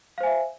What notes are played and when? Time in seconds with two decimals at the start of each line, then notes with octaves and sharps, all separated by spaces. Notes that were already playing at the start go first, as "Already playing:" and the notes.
0.18 F5
0.21 C5
0.23 G#5
0.26 E5